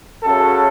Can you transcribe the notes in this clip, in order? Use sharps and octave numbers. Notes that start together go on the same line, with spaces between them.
F#2 C#3 F#3 A4